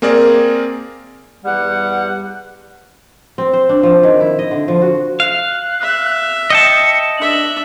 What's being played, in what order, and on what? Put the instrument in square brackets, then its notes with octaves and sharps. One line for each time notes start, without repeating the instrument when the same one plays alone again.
[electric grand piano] A#3 C4 G#4 A#4 D5
[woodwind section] E2 G3 G4 F#5
[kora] C4
C5
D4
F3
D#3
E4
D#5
D3
F3
F#4
[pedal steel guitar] F5 [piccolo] F#6
[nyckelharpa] E5
[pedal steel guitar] D#5 G5 A5 [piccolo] C#7
[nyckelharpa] D4 E5 [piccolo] F#7